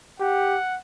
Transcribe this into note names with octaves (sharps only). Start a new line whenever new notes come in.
G4 F#5